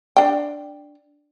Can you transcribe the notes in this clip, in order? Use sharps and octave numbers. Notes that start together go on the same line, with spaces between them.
D4 G5